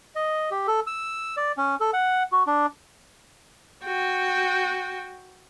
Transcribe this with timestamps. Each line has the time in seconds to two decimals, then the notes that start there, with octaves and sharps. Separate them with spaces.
0.15 D#5
0.51 G4
0.67 A4
0.87 E6
1.37 D5
1.57 C#4
1.80 A4
1.93 F#5
2.32 F#4
2.47 D4
3.84 F#4 G5